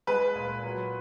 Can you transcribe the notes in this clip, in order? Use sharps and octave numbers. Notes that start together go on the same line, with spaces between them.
G#3 B4
A#2
F#3